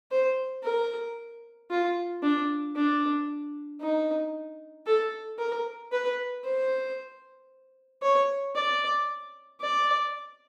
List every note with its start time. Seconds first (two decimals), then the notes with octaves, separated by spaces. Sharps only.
0.12 C5
0.64 A#4
1.70 F4
2.23 D4
2.76 D4
3.81 D#4
4.86 A4
5.38 A#4
5.92 B4
6.44 C5
8.02 C#5
8.55 D5
9.61 D5